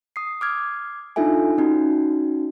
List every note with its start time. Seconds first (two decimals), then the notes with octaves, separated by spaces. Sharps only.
0.16 D#6 C7
0.41 D6 F6 G#6
1.16 D4 D#4 F4 A4 E5 G#5
1.58 C#4 D#4 F#4